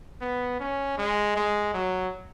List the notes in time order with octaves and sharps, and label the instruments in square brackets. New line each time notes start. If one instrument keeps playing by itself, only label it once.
[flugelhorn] B3
C#4
G#3
G#3
F#3